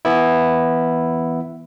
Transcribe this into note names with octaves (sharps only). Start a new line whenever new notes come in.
E3 B3 E4